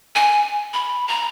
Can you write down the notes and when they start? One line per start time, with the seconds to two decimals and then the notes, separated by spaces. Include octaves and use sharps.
0.16 G#5
0.73 B5
1.08 A#5